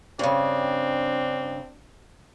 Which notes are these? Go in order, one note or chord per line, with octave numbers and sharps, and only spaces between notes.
G2 C#3 C4 D4